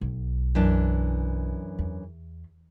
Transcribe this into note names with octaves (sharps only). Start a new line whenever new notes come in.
B1
F#2 E3 D4
E2